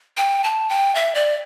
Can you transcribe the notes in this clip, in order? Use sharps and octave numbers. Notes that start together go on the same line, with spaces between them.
G5
A5
G5
E5
D5